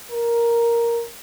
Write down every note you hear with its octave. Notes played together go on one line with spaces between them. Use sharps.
A#4